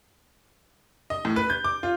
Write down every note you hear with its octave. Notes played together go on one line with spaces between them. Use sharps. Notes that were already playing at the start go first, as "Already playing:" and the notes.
D#5
A2
B4
G6
D6
F4